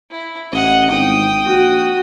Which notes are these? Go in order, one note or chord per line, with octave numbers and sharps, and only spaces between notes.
E4
A1 D#5 F#5
G#1 G5 D#6
A#1 F#4